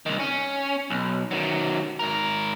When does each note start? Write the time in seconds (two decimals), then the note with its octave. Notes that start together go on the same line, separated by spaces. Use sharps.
0.06 C2 D#3
0.19 C#4
0.90 B1
1.31 D#3 F#3
1.99 G#2 A#4